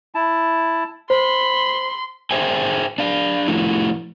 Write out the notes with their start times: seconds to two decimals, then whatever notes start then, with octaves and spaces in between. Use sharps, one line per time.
0.15 E4 A5
1.10 C5 B5 C6
2.31 G#4 C5 E5 G5 G#5
2.98 D4 F5
3.48 F3 A3 E4